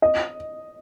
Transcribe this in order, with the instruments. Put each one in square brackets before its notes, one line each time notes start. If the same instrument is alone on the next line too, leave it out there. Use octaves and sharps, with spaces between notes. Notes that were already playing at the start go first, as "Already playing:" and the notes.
[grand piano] D#5